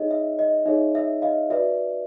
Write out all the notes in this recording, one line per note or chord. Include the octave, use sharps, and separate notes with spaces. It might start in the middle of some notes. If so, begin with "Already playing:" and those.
Already playing: D#4 G#4 C#5 D#5
E5
D#5
D#4 G#4 C#5 E5
E5
D#5 F5
F#4 B4 D5 E5